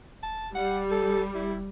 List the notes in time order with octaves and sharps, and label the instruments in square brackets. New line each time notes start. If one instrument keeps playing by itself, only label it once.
[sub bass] D#1 [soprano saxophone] A5
[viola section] G3 [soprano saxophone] F#5
[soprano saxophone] A4
[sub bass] E1 [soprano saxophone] E4